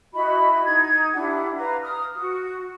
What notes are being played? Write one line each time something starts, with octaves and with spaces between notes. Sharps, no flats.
E4 F#4 D#5 B5
D#4 G#6
D4 E4 G4 F#5
B4 F5 A#5
D#6 F6
F#4